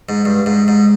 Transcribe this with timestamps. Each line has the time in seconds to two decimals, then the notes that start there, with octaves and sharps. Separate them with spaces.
0.09 G#2
0.25 G2
0.46 G#2
0.68 G#2